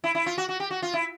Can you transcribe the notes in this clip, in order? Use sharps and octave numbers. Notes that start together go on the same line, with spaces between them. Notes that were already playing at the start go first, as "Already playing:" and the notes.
E4
E4
F4
F#4
F#4
G4
F#4
F4
E4